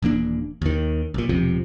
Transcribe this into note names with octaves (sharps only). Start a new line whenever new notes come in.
D#1 E3 A#3 D4
D#2 D#3
B1 A#2
E1 B1 C3 F3